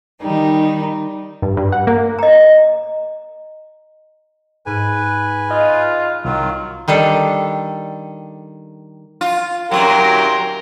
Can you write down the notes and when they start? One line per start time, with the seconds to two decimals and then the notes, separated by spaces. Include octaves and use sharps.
0.22 D#3 G3 D#4
1.42 G2
1.57 G2
1.72 F#5
1.87 A#3
2.19 D#5 A#5
2.41 D#5
4.66 G#2 B4 G#5
5.51 F4 D#5 A5
6.25 C2 D#3 F#3 F4
6.88 D#3 G3 D4 A4
9.21 F4
9.71 F#2 A#2 F#3 G4 A#4 C6